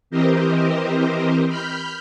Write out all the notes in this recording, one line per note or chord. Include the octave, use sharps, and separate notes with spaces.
E3 C4 G4 A#4 C5 D#5
B5 F6 G6